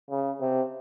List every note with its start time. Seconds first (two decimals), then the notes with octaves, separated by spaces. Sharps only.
0.11 C#3
0.41 C3